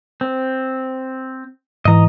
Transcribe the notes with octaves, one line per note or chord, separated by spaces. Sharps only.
C4
G#2 E3 D#5 A#5